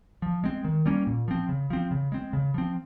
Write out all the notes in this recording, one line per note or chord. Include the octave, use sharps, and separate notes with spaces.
F3
G#3 C4
D#3
G3 A#3 C#4
A#2
F3 C4
C#3
F3 C4
C#3
G#3 C4
C#3
F3 C4